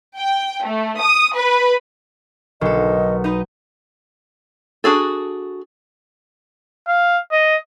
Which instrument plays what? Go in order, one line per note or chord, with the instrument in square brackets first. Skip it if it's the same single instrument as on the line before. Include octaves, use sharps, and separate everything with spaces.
[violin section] G5
A3
D#6
B4
[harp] B1 [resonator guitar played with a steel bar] D3 A4 [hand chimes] A#4 C#6 F6 [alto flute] D#5
[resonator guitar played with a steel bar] D#4 B4 [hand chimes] G6
[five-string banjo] D4 F#4 G#4 A4
[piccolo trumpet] F5
D#5